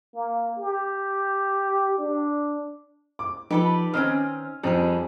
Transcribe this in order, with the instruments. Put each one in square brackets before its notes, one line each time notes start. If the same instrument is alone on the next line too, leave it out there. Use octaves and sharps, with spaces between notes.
[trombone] A#3
G4
D4
[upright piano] D6
[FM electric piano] F3 D#4 [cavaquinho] G4 A4 D5 [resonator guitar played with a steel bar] B4
[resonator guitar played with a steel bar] D#3 C4 C#4 [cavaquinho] D#5 G#5 [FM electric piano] F6
[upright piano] F2 [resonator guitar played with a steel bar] G3 [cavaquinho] D#4 G4 G#4